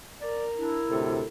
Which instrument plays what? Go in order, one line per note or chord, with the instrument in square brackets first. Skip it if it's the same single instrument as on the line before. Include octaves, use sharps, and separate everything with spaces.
[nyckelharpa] A#4 [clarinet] D5
[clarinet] D4 [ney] E4
[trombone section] D2 A2 C3 [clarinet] A4